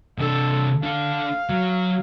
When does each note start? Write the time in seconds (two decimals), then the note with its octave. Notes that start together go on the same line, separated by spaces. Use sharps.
0.18 C3 D4 A4
0.83 D4 A4 F5
1.49 F#3